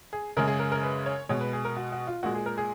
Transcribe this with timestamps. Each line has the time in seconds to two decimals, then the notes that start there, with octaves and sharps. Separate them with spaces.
0.13 G#4
0.37 F#2 C#3 G#3 A#4
0.48 G#4
0.59 A#4
0.72 A#4
0.83 B4
1.06 C#5
1.29 B2 G#3 C#5
1.41 B4
1.53 G#4
1.65 A#4
1.77 F#4
1.92 F#4
2.07 F4
2.23 A#2 G#3 F#4
2.35 G#4
2.46 A#4
2.58 G#4